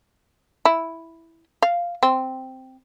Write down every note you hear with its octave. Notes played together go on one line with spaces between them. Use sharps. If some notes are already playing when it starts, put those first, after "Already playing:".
E4
F5
C4